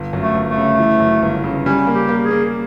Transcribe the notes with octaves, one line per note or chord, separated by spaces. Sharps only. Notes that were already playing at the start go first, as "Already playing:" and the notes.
Already playing: G1
F#2
A3
G1
A3
C#3
E3
F#2
G1
C#3
G3 C#4
A#3
G4
A#3
G#4
A#3